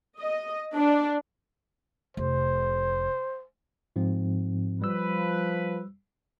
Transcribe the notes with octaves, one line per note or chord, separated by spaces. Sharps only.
D#5
D4
F1 C5
G#2 F3 C4
F3 G3 B4 E6